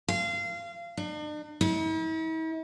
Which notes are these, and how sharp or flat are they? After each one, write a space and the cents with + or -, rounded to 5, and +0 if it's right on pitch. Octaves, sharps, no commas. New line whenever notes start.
F5 -25
D4 +45
E4 -45